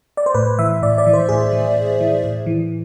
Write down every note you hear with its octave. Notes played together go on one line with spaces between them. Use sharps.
D5
C5
A2 B4
E3 E5
A2 D5
D5
E3
C5
A2 G#4
E3
A2
E3
A2
E3